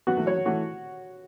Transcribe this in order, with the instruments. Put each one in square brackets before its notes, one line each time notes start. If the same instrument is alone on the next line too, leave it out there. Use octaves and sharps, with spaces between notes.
[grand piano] F#3 B3 [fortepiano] F#4
[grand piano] E3 A3
[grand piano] F#3 [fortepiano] C#5
[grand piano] F#3
[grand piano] E3 A3 [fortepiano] F#4